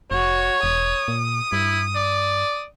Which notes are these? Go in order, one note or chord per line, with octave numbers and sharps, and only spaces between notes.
F1 F#4 C#5
E1 D#6
A#2
G2 E4
D5